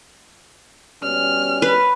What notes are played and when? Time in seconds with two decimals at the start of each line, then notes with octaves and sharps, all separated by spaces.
1.03 B2 G3 C#4 F6
1.62 B4